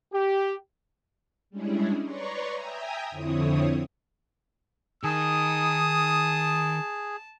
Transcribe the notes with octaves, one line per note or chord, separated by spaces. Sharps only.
G4
G3 G#3 C#4 D4 E4 G#4
B4 C#5 D5 A#5 C6 C#6
E5 G5 G#5 A#5 D#6
F2 D3 C4 E4 C#5 D#6
D#3 G#4 A5 D#6